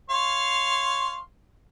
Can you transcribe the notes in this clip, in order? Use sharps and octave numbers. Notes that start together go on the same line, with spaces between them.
C#5 F5 C6